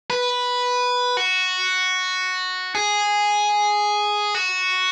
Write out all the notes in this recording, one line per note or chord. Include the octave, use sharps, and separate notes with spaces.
B4
F#4
G#4
F#4